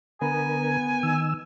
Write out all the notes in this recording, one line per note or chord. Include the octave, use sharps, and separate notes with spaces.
D3 B3 A#4 G#5
D#3 E6